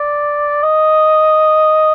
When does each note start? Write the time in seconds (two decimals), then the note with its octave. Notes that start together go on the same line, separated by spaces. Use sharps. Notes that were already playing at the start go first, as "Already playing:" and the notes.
Already playing: D5
0.63 D#5